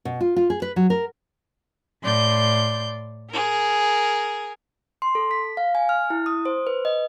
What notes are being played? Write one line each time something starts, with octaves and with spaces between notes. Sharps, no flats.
B2
F4
F4
G#4
B4
F#3
A#4
A2 D5 C6 G6
G#4 A#4
C6
A4
B6
F5
G#5
F6
E4
D#6
C5
B4
D#5